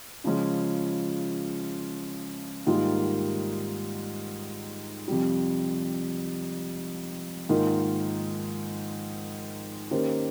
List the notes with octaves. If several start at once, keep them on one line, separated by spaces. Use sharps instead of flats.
C#3 F3 G#3 C#4 F4
G#2 D#3 G3 A#3 F4
F2 C3 G3
G#2 D#3 A#3 F4
D#3 A#3 C#4 G4 C5